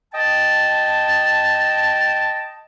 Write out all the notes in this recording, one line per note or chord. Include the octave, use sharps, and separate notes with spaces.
D#5 G5 A5